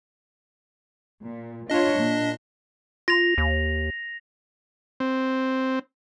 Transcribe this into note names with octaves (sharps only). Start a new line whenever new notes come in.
A#2
D4 F4 C#5 D#5
A#2
F4 A#6 F7
D#2
C4